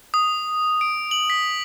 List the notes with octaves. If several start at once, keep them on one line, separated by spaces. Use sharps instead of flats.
D#6
D7
F#7
B6